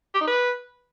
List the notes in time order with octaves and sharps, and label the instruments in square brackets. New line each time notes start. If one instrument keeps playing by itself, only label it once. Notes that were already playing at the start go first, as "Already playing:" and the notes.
[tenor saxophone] G4
D#4
B4